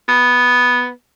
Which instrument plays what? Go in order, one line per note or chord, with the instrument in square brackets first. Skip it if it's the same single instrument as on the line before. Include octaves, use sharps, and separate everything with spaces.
[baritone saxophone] B3